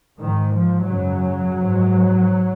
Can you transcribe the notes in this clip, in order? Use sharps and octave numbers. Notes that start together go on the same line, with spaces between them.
G#2 D#3
F3
F#2 C#3 F#3
G#2